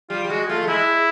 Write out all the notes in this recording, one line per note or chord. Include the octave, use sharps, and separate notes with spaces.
G3 F4
G3
G#3 F#4
A3 F4
A3
G#3 E4